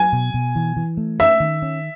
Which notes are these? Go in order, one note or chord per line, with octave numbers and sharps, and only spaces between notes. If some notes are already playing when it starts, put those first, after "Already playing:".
Already playing: F#3 G#5
B2
B2
E3
E3
A3
C#4 E5
D#3
C#4